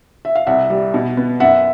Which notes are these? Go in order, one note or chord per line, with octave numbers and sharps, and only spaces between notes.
E5
F5
C2 E5 F#5
G3
B2
B3
F#2 E5 F#5